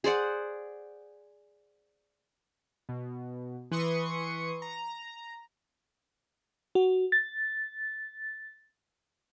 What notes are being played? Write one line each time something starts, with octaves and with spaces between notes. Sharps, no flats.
G#4 C5 D5 F#5
B2
E3 B4 C6 C#6 D#6 C#7
A#5
F#4
A6